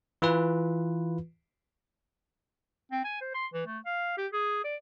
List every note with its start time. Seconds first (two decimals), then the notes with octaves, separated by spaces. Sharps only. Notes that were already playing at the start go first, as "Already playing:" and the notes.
0.22 E3 F4 B4
2.92 C4
3.04 G#5
3.21 C5
3.35 C6
3.53 E3
3.66 A3
3.86 F5
4.18 G4
4.33 G#4
4.64 D5